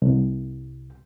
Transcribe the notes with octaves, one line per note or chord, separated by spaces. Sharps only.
C2